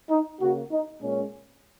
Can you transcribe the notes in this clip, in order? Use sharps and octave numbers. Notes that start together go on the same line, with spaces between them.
D#4
C#3 A#3 F#4
D#4
A#2 G#3 C#4